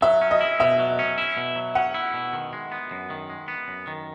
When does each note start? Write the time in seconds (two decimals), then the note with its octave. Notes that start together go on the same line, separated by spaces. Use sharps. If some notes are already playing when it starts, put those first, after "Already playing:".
0.02 F#3 E5
0.22 C#4
0.31 D#5
0.41 E4
0.60 B2 E5
0.79 F#3
0.99 C#4
1.18 E4
1.37 B2
1.56 F#3
1.75 C#4 F#5
1.94 E4
2.14 B2
2.33 D#3
2.53 G#3
2.72 B3
2.91 F#2
3.10 D#3
3.30 G#3
3.48 B3
3.68 F#2
3.87 D#3